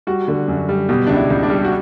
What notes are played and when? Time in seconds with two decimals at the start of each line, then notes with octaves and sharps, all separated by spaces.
0.07 G3 F#4
0.28 D3
0.48 F#2
0.69 G3
0.89 B2 G4
1.07 C#2 D4
1.16 E4
1.30 C#2
1.43 D4
1.50 G3
1.65 F#4